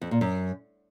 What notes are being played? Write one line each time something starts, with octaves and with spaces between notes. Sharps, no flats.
F2
A#2
F#2